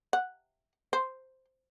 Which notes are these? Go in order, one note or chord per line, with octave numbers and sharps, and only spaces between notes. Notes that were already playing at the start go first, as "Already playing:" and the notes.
F#5
C5